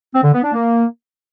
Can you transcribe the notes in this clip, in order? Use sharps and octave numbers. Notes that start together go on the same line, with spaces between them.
C4
D3
B3
D4
A#3